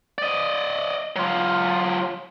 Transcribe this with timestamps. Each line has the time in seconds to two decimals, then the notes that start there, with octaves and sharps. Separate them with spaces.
0.18 D5 D#5
1.16 F#3 F4